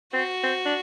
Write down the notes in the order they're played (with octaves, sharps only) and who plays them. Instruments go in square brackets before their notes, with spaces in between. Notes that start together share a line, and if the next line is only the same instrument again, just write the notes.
[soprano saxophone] C4 [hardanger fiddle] F#4
[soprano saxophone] C4
D4